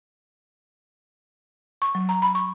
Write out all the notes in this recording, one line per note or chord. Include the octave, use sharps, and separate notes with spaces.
C#6
F#3
A#5
B5
C#6